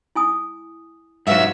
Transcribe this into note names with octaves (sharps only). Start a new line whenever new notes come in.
E4 G#5 D#6
G#2 F#3 B4 E5 F5 E6